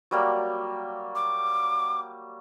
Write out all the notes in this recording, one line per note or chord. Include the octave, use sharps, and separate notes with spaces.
F#3 G3 A#3
D6